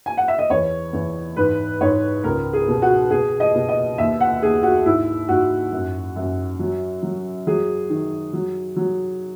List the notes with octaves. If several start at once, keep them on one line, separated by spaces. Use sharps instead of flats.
G#5
F#5
E5
D#5
E2 C#5
E2
G#2 B4
G#2 C#5
C#2 A#4
G#4
B2
F#4
B2 G#4
D#5
B2
D#5
D#2 E5
F#5
D#2 G#4
F#4
G#2 E4
G#2 F#4
F#2
F#2
F#3
F#3
F#3 G#4
D#3
F#3
F#3